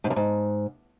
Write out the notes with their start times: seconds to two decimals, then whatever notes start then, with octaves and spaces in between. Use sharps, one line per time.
0.04 G#2
0.10 F#2
0.16 G#2